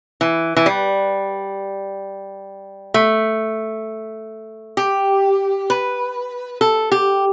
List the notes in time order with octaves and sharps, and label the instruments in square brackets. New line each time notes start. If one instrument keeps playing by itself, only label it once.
[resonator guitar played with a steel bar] E3
E3
G3
A3
G4
B4
A4
G4